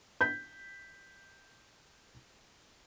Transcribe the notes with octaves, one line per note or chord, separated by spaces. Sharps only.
G6 B6